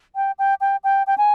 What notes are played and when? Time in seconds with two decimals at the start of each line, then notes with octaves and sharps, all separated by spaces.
0.16 G5
0.39 G5
0.61 G5
0.84 G5
1.07 G5
1.18 G#5